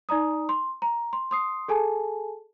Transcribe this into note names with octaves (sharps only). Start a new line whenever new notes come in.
D#4 D5 A#5 D#6
C6
A#5
C6
C6 D#6 C7
G#4 A4 G#5 A5